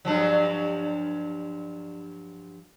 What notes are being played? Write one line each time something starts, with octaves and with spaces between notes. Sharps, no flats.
G2 F3 F#3